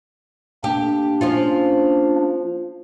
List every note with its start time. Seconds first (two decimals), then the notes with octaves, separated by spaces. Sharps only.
0.64 A#3 D4 G4
1.21 F3 C#4 F4